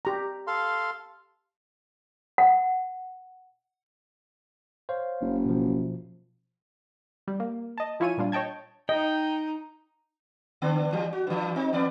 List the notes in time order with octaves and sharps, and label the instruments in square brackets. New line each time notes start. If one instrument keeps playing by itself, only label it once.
[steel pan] G4 A#5
[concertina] A4 F5 C6
[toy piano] F#5
[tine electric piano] C5 C#5 F5
[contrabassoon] F#1
[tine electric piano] B2 F3
[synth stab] G3
A#3
D#5 A5
F3 E4 F4 C#5 G#5 D#7
A#2 G3 D4 F4
C#5 D#5 G5 A5 G#6
[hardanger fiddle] D#4 [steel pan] D#5 [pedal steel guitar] G5
[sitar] D3 B3 D4
E3 G3
F#4
G2 E3
C4 D#4
E2 B3 D5